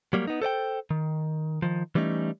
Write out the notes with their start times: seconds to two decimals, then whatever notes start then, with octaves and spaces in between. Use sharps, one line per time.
0.13 F#3 G3 A#3
0.27 B3 D#4
0.42 A4 C5 D5 G5
0.91 D#3
1.62 D#3 F3
1.95 E3 G3 A3 C#4 D#4